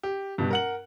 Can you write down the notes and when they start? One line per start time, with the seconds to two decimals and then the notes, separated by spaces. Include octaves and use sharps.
0.03 G4
0.38 G2 B2
0.51 A#4 F#5 F#7